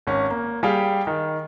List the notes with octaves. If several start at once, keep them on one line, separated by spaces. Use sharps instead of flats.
G#1 C#4
A#3
G3 G4 G#4 F5 G5
D#3